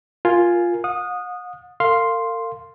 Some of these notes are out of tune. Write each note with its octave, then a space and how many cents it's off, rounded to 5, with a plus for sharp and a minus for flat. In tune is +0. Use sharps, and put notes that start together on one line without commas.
F4 +0 A#4 +5 G#5 +0
F#5 -45 D#6 -10
A#4 -45 F5 +0 C6 +0